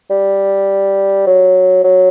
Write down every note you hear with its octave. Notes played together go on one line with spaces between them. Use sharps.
G3
F#3
F#3